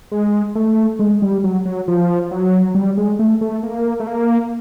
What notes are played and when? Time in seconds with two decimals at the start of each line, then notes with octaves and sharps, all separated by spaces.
0.12 G#3
0.55 A3
0.99 G#3
1.22 G3
1.44 F#3
1.65 F#3
1.88 F3
2.31 F#3
2.75 G3
2.97 G#3
3.19 A3
3.41 A3
3.63 A#3
4.00 A3
4.07 A#3